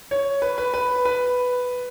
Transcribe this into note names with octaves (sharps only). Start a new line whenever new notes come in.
C#5
B4
B4
B4
B4